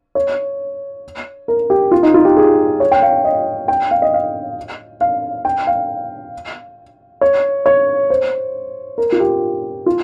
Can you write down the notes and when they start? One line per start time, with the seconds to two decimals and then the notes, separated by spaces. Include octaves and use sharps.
0.15 C#5
1.48 A#4
1.70 G4
1.91 F4
2.03 D#4
2.14 F4
2.25 G4
2.37 G#4
2.80 C#5
2.92 G5
3.02 F5
3.25 D#5
3.68 G5
3.91 F5
4.02 D#5
4.14 F5
5.01 F5
5.45 G5
5.67 F5
7.21 C#5
7.66 C#5
8.10 C5
8.98 A#4
9.12 F4
9.20 G4
9.86 F4